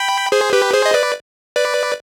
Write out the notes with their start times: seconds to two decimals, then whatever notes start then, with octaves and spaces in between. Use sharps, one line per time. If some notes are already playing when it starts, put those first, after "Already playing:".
Already playing: G5 B5
0.32 G#4 C5
0.53 G4 B4
0.73 G#4 C5
0.86 D#5
0.94 B4 D5
1.56 B4 D5